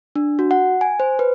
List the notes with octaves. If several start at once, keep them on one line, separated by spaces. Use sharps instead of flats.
D4
F#4
F#5
G#5
C5
B4